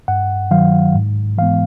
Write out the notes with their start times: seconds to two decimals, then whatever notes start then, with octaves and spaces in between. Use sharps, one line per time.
0.08 G2 F#5
0.51 D#3 F#3 F5
0.95 G#2
1.38 E3 G#3 B3 F5